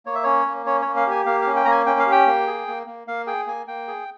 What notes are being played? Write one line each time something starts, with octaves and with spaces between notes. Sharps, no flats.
A#3 C#5
E5
C#4 C#5
A#3
C#4 C#5
A#3 C#5
F5
G4 G#5
A#3 F5
C#4 F5
G5
A#3 A#5
G#5
C#4 G5
F5
G4
G5
A#3
G#4
A#3
A#3
A#3 F5
G#4 G5
A#3 G#5
A#3 G5
G#4